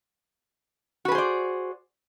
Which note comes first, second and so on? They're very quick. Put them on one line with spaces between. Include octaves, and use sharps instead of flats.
F#4 B4 G#4 C5 D5